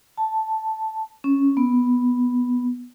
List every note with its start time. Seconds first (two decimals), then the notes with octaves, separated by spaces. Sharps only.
0.17 A5
1.24 C#4
1.57 B3